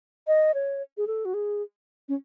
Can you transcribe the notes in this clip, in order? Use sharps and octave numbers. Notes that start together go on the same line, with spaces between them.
D#5
C#5
G#4
A4
F#4
G#4
C#4